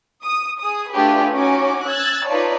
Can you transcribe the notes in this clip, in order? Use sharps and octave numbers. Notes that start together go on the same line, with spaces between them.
D#6
G#4 D#6
A3 D4 F4 G4 G#4 B4
C#4 D#4 F#4 G#5 D6
E6 F#6 G#6 A6
D#4 F4 B4 C#5 D5 A5